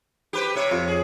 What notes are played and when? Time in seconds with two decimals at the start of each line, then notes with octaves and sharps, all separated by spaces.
0.33 G4 B4 C5
0.56 C3 C#5
0.71 F2
0.88 G#4